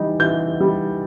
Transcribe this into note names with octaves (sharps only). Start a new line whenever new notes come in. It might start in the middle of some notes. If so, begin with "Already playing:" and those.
Already playing: E3 G3 D#4
E3 G6
G3 D#4